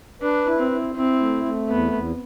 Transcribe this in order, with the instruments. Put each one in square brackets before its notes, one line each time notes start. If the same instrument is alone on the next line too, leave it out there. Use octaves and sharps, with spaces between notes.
[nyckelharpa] D4 [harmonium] B4
[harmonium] E4
[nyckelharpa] C4
[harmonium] E4
[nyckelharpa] C4 [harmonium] E4
[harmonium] A3
A3
[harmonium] E2 [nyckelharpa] B3
[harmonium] E2